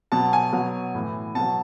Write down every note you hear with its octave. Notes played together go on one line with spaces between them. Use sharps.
B2 F#3 A5
G#5
B2 F#3
A2 E3
B2 F#3 A5